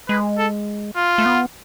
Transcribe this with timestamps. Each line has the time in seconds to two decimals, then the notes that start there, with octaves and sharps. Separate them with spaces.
0.09 G#3 B4
0.38 A4
0.97 F4
1.18 A3
1.26 B3